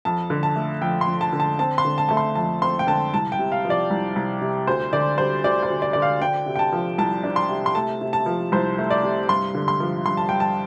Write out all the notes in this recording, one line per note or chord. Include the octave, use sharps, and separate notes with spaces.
F2 A5
D3
A5
A3
F2 G5
C6
F2
A5
D3
A5
C4 A5
C6
D3
A5
A3 A5
C6
F2 A5
C4 C6
G5
D3 A5
C2 A5
G5
C3
F5
F3
D5
C2
C2
C3
D2 C5
D3 D5
G3 C5
D2 D5
C5
D2
D5
D3 D5
F5
D4 G5
C3
G5
A5
F3
C2 A5
D4
C6
C3
C6
A3 A5
C3
A5
F3
C2 C5
A3
D5
C3
G2 C6
D3
C6
F3
G2 C6
A5
G2 G5
A5